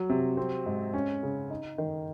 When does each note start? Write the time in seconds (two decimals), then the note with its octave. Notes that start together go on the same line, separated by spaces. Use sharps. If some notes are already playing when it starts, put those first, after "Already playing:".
Already playing: F#3
0.09 C3
0.37 C4
0.66 G#2
0.93 C#4
1.23 C#3
1.50 D#4
1.78 D#3